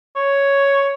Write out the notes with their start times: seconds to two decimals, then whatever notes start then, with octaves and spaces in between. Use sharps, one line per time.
0.16 C#5